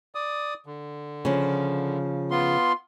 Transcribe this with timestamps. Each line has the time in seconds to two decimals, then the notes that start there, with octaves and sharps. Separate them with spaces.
0.15 D5 D#6
0.66 D3
1.25 C#3 F3
2.31 B3 F4 C6